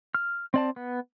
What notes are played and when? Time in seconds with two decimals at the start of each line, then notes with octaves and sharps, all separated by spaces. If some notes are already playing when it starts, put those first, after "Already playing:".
0.15 F6
0.54 C4 D5 A5
0.76 B3